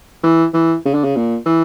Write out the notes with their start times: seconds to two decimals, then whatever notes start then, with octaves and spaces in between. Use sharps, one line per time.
0.23 E3
0.54 E3
0.85 C#3
0.94 D3
1.04 C#3
1.16 A#2
1.46 E3